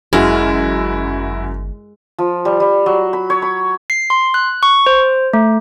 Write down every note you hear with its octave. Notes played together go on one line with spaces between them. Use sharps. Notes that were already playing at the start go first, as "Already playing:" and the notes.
G1 F#2 G#3 E4 F#4 F6
F3
G3
G3
F#3
B5
C#5
B5
C7
C6
F#6
C#6
C5
A3